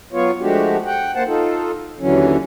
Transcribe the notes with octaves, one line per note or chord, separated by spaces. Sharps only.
F#3 B3 F4 C#5
F3 G#3 A3 D4 F#4 G4
F#5 G5
A#3 C5 F#5 A5
D#4 F4 A4
D#2 D3 E3 F#3 C#4